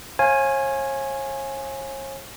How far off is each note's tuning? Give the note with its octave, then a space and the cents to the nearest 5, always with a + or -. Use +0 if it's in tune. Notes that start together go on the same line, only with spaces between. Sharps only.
C#5 -40 F5 -5 G#5 +0